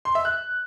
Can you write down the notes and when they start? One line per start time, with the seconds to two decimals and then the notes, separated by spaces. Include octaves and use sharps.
0.05 C6
0.15 E5
0.25 F#6